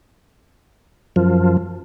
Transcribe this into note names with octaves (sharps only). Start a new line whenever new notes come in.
F#2 F3